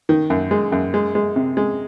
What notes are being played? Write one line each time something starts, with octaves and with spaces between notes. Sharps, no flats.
D#3
F#2
G#3
F#2
G#3
G#3
C3
G#3